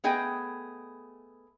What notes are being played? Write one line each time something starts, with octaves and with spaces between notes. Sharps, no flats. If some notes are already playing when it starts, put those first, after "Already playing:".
A3 B3 G#4 D#5 G5